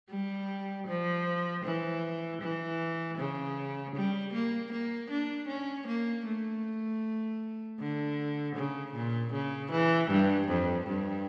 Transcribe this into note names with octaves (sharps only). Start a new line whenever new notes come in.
G3
F3
E3
E3
C#3
G3
A#3
A#3
D4
C#4
A#3
A3
D3
C#3
A#2
C#3
E3
G2
F2
G2